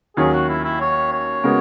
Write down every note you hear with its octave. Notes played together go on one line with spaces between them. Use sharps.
D#2 D#3 F#3 C#4 G#4
F#4
E4
E4
C#5
C#5
C#3 G#3 B3 F#4 A#4